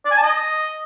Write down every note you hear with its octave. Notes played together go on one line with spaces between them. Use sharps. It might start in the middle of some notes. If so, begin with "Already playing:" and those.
D5
G#5
A5
D#5